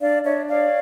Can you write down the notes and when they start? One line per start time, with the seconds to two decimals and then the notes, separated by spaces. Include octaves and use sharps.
0.01 D4 D5 F5
0.25 D4 C#5 E5
0.49 C#5 D5 F5